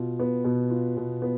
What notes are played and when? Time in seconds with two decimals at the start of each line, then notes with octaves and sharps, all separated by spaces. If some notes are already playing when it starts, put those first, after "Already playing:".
Already playing: B2 F4
0.20 B3
0.45 B2
0.70 F4
0.97 B2
1.22 B3